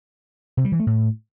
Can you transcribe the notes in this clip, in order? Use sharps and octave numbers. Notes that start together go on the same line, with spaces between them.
C3
G3
E3
A3
A2